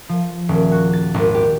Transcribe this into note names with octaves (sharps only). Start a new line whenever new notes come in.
F3
D#1
F#4
A6
G#1
G4